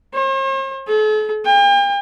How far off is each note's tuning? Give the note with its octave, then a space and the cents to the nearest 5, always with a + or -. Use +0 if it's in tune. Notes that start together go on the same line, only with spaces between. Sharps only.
C5 +45
A4 -45
G5 +40